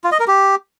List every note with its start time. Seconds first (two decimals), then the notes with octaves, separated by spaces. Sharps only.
0.04 F4
0.12 D#5
0.20 A#4
0.28 G4